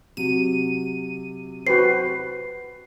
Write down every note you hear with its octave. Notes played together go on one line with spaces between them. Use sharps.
C3 F#3 D#7
F#4 B4 C5 C7